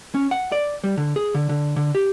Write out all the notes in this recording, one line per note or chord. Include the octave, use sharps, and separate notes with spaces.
C#4
F#5
D5
G3
D3
G#4
D3
D3
D3
G4